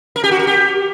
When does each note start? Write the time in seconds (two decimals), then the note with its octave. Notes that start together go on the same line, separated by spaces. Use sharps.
0.16 A#4
0.24 G4
0.31 F#4
0.39 A#4
0.47 G4